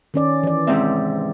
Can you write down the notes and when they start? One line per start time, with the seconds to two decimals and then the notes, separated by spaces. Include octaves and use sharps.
0.14 D#3 C#4 D5
0.43 E3 D5
0.67 G#2 C3 C4 E5